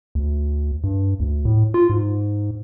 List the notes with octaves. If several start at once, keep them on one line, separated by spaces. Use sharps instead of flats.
D2
G2
D2
A2
F4
G#2